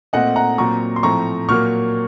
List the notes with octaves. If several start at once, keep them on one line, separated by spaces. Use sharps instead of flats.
A#2 A3 C4 D#5 F#5
F#5 A#5
A#2 F#3 C4 A#5 C#6
C6
A2 F3 A3 C4 A#5 C#6
A#2 F#3 A#3 C#6 F6